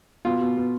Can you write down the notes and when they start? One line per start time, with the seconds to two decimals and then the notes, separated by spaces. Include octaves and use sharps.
0.25 B2 F4
0.41 B2
0.57 B2